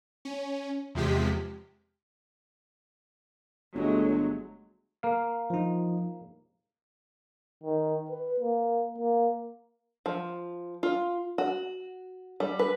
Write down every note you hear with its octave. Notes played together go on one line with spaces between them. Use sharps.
C#4
E2 C3 F3 G#3 G4 B6
G1 F#3 G#3 A3
A#3 F5
F3 D#4
D#3
B4
A#3
A#3
F3
F4
F#4
G3
B4